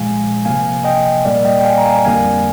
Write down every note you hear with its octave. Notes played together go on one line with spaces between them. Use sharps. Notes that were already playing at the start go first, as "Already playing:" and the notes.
Already playing: A#2 F3 G#3 F5 G#5
C3 F3 A#3 F5 G#5
D#5 G5
A#2 G3 A#3 D5 F5
D#5 G5
G5
F5 G#5
A#5
F5 G#5
F2 D3 G3 A#3 F5 G#5